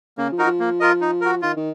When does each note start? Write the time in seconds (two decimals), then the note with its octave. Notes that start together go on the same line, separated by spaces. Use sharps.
0.18 C#3 A#3
0.32 F3
0.38 D#4 F#4 A#4
0.45 F3
0.60 A#3
0.80 F4 A#4 D#5
1.01 D#4
1.21 F#4 A#4
1.42 D#3 F4
1.56 D#3